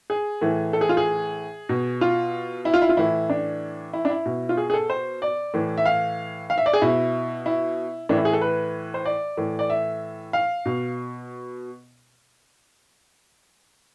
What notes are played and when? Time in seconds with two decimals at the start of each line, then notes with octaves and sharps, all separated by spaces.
0.10 G#4
0.42 A2 E3
0.73 A4
0.81 G#4
0.89 F4
0.97 G#4
1.69 B2
2.01 F4
2.65 E4
2.74 F4
2.82 E4
2.89 F4
2.97 A2 E3 E4
3.30 D4
3.93 E4
4.05 D4
4.10 E4
4.26 B2
4.49 F4
4.57 G#4
4.70 G#4
4.74 A4
4.90 C5
5.22 D5
5.54 A2 E3
5.78 E5
5.86 F5
6.50 F5
6.58 E5
6.66 D5
6.73 G#4
6.82 B2 E4
7.46 E4
8.09 A2 E3 D4
8.17 E4
8.25 G#4
8.33 A4
8.41 B4
8.94 C5
9.05 D5
9.37 A2 E3
9.59 D5
9.70 E5
10.33 F5
10.66 B2